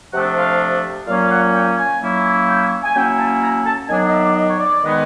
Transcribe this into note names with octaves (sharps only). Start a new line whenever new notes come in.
C3 F3 A3 D4 F#5
F5
A#2 F#3 A#3 C#4 F5
F5
F#5
G5
G#5
F#3 A#3 C#4 E4
G5
G#5
F#3 A#3 C#4 E4 G5
G#5
A5
A#5
A5
D#3 F#3 B3 D4 G#5
D#5
E5
D5
D#5
C#5
D5
D#3 G#3 B3